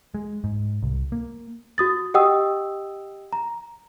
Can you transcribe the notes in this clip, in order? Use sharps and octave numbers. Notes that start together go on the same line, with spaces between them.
G#3
G#2
C2
A#3
F#4 D#6 A6
G4 D#5 F#5 G5 D#6 E6
A#5